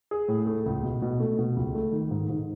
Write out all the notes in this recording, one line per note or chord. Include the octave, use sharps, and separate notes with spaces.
G#4
A2
A3
C#2
B2
B2
A3
B2
C#2
A3
D#3
G#2
G#2